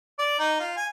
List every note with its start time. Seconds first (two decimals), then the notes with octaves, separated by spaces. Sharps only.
0.19 D5
0.39 D#4
0.60 F4
0.77 G#5